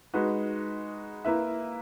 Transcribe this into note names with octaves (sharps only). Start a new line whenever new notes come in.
G#3 D#4 F#4 B4
A#3 E4 B4 E5